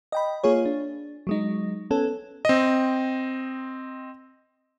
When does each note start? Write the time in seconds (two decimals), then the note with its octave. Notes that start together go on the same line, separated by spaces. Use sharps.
0.12 D#5 G5 B5
0.44 A#3 F4 G#4 C#5
0.65 D4
1.27 F#3 G#3 D#4
1.91 B3 C#4 A4
2.45 C4 D#5